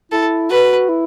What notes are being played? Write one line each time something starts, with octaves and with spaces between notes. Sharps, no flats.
E4 A4
F#4 B4
E4